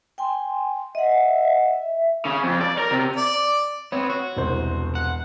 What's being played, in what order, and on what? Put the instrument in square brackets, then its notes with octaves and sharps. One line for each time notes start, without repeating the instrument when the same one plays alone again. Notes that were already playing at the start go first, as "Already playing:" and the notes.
[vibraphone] G5 G#5 C6
[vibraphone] D#5 F#5 [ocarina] E5
[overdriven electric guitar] C#3
F2
D5
A#4
C3
[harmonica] D5
[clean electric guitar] B3 C4 [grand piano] C#5
[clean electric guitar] F#4
[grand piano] E1 C2 C5
[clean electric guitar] F#5